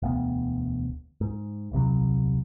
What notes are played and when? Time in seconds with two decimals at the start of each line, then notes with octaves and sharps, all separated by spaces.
0.02 E1 D2 B3
1.21 G#2
1.72 D#1 C2 C3 F#3